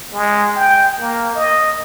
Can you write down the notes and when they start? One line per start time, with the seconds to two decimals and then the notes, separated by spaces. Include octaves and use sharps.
0.13 G#3
0.56 G5
1.00 A#3
1.35 D#5